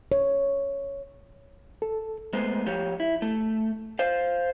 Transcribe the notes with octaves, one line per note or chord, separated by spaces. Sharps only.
C#5
A4
G#3 A3 B3 C5
F3 G4 C#5
E4
A3
C5 F5